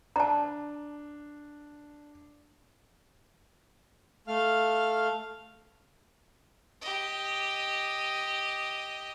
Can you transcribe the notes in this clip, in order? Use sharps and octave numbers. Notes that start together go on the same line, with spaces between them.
D4 A5 A#5
A3 F5 F6
G4 D#5